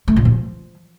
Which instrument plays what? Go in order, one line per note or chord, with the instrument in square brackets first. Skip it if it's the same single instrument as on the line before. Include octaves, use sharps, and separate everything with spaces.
[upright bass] A3
A#2
F3